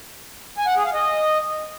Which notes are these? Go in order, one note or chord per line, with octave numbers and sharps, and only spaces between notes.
G#5
F#5
G#4
F5
D#5